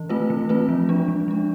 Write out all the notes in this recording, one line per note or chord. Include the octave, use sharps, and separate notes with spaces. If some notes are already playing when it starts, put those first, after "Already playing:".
Already playing: E3
A3 C4 F4 B4
E3
A3 C4 F4 B4
F3
G#3 D4
F3
G#3 D4